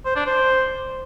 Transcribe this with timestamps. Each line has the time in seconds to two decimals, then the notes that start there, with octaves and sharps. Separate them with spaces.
0.06 C5
0.16 D4
0.26 C5